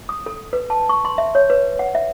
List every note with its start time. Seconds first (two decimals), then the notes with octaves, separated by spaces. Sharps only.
0.09 D#6
0.26 A4
0.53 B4
0.70 A5
0.89 C#6
1.05 C6
1.18 E5
1.35 C#5
1.50 B4
1.79 F#5
1.95 E5